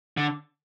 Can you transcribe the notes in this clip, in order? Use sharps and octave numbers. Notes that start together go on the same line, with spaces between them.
D3